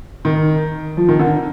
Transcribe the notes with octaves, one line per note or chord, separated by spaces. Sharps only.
D#3
F3
D#3
D3